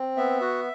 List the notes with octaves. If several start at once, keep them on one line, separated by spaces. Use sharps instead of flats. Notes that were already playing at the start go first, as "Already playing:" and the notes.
Already playing: C4
B3 E5
F#4